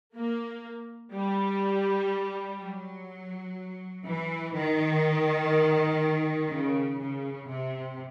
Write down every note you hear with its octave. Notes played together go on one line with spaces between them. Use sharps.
A#3
G3
F#3
E3
D#3
C#3
C#3
C3